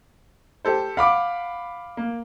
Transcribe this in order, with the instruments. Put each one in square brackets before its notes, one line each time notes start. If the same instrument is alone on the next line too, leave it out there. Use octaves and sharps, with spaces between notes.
[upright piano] G4 A4 C5
[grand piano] F5 B5 D6 [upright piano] F#5
[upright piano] A#3